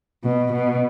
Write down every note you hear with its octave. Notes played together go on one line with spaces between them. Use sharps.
B2
B2